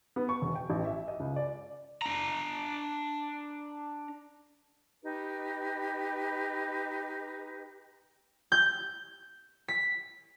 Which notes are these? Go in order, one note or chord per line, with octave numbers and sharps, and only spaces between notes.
B3
C#6
E1
G5
A1
E5
D#5
C#2
D5
D4 A#5
D#4 G4 B4
G6
B6